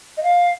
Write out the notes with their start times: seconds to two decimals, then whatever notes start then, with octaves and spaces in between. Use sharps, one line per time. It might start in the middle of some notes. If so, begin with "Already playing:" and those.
0.17 D#5
0.23 F5